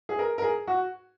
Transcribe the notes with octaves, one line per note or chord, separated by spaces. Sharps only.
G#4
A#4
A#4
G#4
F#4